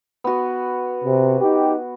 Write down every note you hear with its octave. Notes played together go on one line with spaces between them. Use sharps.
B3 F#4
C3
D#4 G4